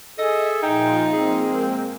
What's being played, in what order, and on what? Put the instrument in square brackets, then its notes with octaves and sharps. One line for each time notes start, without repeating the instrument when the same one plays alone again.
[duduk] G#4 [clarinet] A4 [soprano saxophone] D#5 [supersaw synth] E5
[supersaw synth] A#2 F3 F4 [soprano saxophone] D#4 [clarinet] G5
[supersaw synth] G#3 A#3 [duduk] C4 [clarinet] G#4